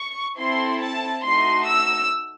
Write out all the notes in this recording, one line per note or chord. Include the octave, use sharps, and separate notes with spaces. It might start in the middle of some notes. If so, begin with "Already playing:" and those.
Already playing: C#6
C4 E4 A4 C6
A5
A3 D#4 F#4 C6
E6